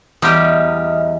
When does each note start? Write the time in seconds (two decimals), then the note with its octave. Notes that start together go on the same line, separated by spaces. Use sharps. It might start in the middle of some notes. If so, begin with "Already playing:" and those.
0.22 E2 G3 G4 D#5 E5 D#6 F6